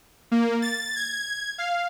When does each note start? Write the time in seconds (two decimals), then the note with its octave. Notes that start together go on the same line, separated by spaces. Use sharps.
0.31 A#3
0.62 A6
0.96 G#6
1.58 F5